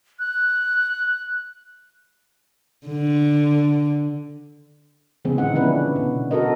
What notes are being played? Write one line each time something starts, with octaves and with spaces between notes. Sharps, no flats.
F#6
D3
C#3 E3 G#3 B3 C4 G#4
A#2 D3 D#4 F#5
F3 B3 C#4 D4 E4 B4
B2
F#4 A4 A#4 D#5